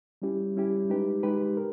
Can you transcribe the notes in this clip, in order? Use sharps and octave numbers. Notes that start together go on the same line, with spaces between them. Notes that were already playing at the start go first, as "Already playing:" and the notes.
G3 C#4 E4 G4
G3 C#4 E4 G4
G#3 D#4 G4 B4
G#3 D#4 G4 B4
A#4